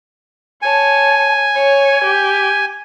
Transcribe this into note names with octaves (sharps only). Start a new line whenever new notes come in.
C#5 G#5 A5
C#5
G4